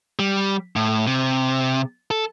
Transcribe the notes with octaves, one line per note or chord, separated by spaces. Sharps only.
G3
A2
C3
A4